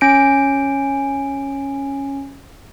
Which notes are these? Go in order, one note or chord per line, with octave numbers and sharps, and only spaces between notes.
C#4 D7